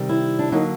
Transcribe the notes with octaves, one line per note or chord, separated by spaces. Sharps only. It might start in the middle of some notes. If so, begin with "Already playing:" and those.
Already playing: C3 D#3 G3 C4
E4
D4
D3 F#3 A#3 D#4